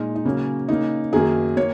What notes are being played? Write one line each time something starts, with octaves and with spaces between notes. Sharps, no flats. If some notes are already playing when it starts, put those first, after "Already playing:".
Already playing: A#2 G#3 D#4
D#4
C#3 F#3 A#3 C#4
C#3 A#3 D#4
F#2 D#3 F#3 A#3 G#4
A#3 C#5